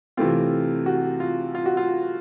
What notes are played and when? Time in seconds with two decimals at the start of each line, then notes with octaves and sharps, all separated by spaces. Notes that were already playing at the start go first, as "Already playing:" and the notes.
0.17 C3 E3 A3 C4 F4
0.86 F#4
1.20 F4
1.55 F4
1.66 F#4
1.77 F4